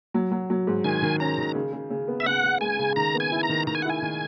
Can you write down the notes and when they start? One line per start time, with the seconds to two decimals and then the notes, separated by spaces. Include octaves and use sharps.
0.14 F#3
0.32 F#3
0.50 F#3
0.67 G#2
0.84 D#3 G#5
1.02 D#3
1.20 C#4 A#5
1.38 D#3
1.55 C#3
1.73 C#3
1.90 C#3
2.08 B3
2.20 E5
2.26 C#3 F#5
2.43 C#3
2.61 G#3 G#5
2.79 C#3
2.96 D#3 A#5
3.14 B3
3.20 G#5
3.32 E4
3.43 A#5
3.49 D#3
3.67 D#3 A#5
3.75 G#5
3.82 F#5
3.85 E4 G#5
4.02 D#3